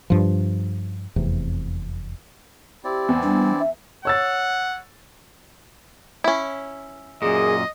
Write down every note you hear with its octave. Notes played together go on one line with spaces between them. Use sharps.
G2 F3
F1 E2 C3
C4 E4 G4 D5
E2
G3 D4
E5
C#5 F#5 E6 A6
C#4 E4
F#2 A#2 G#4 D#5